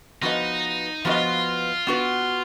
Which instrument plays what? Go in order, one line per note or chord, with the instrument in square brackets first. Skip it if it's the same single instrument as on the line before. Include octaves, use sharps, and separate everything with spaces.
[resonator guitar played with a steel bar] F3 B3 F#4 B4 D#5 [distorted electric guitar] D#4
[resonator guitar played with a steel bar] F3 B3 F#4 B4 D#5 [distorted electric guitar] F4
[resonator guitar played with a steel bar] B3 F#4 B4